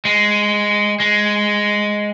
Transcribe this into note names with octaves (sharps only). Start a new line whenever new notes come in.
G#3
G#3